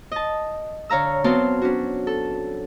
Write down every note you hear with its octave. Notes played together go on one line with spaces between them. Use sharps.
D#5 A5
D3 C#5 F5 A#5 E6
F#3 B3 C4 F5 A5 C6
C#4 D4 F#4
A4